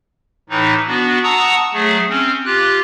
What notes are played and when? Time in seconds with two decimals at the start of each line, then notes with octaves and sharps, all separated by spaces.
0.49 A2 E3 D#4
0.87 B3 D4 F#4
1.23 F#5 A5 A#5 C#6 D#6 E6
1.73 F#3 A3 G#4
2.09 C4 C#4
2.46 F4 G4 F#6